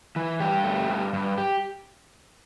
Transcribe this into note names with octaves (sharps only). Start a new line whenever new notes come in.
E3
G2 G4
A3
G2
G2
G4